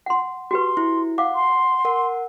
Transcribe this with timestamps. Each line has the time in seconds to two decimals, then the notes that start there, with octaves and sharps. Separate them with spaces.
0.06 F#5 C6
0.51 F#4 G4 B4 C6
0.77 E4
1.18 F5 F#5 D6
1.35 C6
1.85 A#4 F#5